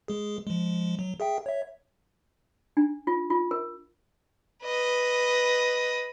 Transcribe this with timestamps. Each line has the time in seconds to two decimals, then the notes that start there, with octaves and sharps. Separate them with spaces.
0.08 G#3 G#4
0.47 F3 G#3
0.99 F#3
1.20 G#4 E5 G5
1.46 C#5 E5
2.77 D4
3.07 F4
3.30 F4
3.51 A#4
4.64 B4 D#5